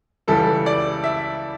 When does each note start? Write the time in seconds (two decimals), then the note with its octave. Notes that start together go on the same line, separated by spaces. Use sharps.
0.28 C#2 C#3 E3 G3 A4
0.66 D5
1.04 E5